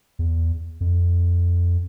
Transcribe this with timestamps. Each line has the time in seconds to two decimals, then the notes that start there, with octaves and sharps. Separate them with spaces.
0.19 E2
0.81 F2